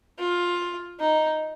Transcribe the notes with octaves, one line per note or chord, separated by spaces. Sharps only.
F4
D#4